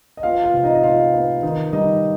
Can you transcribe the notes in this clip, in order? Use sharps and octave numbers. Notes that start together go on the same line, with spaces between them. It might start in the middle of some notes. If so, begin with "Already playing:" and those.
D#5
B3 F4 F5
F4 F5
C3
D#4 D#5
D#5
B3 F4 F5
B3
D#3 D#4 D#5
G3 D#4 D#5